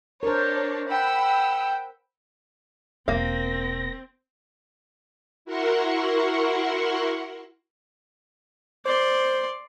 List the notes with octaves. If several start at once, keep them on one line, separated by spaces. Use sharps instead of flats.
D4 A#4 C5 C#5
F#5 G5 B5 E6
E1 A#3 C4 F5 A#6
E4 F#4 A#4 F#5 C6 C#6
C5 D5 C6